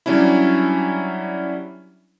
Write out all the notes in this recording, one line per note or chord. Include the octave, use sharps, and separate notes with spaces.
F#3 G3 C#4 D4 E4